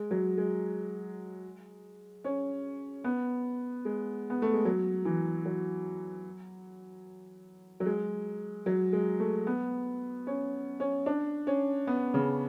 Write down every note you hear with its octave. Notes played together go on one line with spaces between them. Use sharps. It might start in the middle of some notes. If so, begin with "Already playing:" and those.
Already playing: G#3
F#3
G#3
C#4
B3
G#3
B3
A3
G#3
F#3
E3
F#3
F#3
G#3
F#3
G#3
A3
B3
C#4
C#4
D4
C#4
B3
C#3